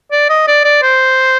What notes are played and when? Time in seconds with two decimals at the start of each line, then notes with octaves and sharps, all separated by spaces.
0.12 D5
0.29 D#5
0.47 D5
0.64 D5
0.82 C5